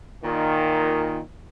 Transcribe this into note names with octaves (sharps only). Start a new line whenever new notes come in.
A#2 D#3